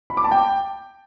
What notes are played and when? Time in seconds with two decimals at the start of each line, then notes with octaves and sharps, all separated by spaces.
0.10 B5
0.17 D6
0.24 A5
0.31 G5